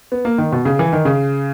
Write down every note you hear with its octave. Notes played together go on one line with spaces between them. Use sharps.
B3
A#3
D#3
B2
C#3
E3
D#3
C#3